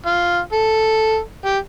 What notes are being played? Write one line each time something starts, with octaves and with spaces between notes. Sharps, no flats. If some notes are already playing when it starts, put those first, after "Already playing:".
F4
A4
G4